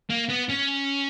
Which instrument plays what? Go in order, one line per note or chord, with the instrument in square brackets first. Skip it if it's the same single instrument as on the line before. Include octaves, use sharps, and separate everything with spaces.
[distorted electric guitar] A#3
B3
C#4